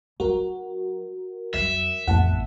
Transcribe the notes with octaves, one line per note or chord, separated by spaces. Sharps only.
F#3 D#4 F#4 A#4
F2 F#3 E5
A1 F2 B3 F#5 A5